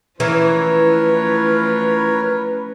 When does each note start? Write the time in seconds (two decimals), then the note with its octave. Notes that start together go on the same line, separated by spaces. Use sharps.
0.20 E3 F3 A3 C#4 A#4 B4 C#5